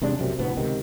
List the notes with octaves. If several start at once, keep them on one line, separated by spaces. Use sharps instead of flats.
E1 C3 G#3 D4
F1 B1 F#2 C3
F1 D2 A2 B3
C#2 C3 D#3